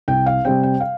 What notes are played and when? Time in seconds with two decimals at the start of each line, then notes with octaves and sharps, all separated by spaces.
0.08 C2 G5
0.26 F5
0.45 C3 G3 C4 G5
0.63 G5
0.80 F5